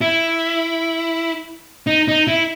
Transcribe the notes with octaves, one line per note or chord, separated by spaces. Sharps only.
E4
D#4
D#4
E4